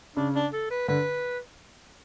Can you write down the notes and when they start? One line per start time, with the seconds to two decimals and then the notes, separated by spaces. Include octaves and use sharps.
0.16 C#3 D4
0.35 D4
0.53 A4
0.71 B4
0.88 D3 B4